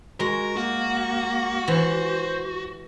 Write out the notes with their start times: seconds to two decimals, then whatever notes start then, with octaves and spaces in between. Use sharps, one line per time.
0.20 G#3 F#4 A#4
0.57 A#3 F#4
1.68 E3 C5